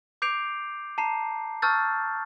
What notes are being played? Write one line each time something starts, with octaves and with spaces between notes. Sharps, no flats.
D6 G6 C7 D7 F7
A5 A#5 C7
A5 C#6 E6 F6 G6 A6